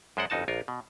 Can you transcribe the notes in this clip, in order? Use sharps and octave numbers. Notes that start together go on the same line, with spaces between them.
F#2 G#3 C5 D5 F#5
G1 F2 D#4 F#4 A5
A#1 F4 A#4
B2